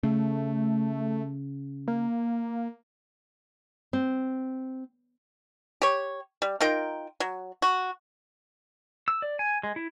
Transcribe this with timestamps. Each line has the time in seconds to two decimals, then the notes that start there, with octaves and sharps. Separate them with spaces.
0.03 C#3 A3
1.88 A#3
3.93 C4
5.82 G4 C#5
6.42 G3
6.60 D#4 F4 A#4 G5
7.20 F#3
7.62 F#4
9.08 E6
9.22 D5
9.39 G#5
9.63 G#3
9.76 E4